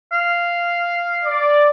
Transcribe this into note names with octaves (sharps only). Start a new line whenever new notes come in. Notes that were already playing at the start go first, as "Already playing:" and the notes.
F5
D5